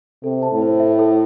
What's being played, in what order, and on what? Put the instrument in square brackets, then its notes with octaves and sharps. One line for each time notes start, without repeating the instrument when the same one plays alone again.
[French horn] C3 [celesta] A4
[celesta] A5
[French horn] A2
[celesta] C5
E5
A4